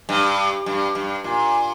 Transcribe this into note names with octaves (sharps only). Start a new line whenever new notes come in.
G2
G2
G2
A#2